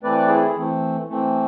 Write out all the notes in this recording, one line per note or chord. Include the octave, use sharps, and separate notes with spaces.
E3 A3 C4 B4 D5
E4 G#4
E3 A3 C4
E3 A3 C4